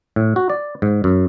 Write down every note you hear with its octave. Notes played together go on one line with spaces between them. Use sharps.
A2
F#4
D5
G#2
F#2